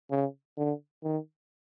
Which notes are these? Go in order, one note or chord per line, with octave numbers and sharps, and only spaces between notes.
C#3
D3
D#3